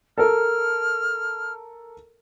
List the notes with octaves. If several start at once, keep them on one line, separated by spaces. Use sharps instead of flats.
A4 A#4 F6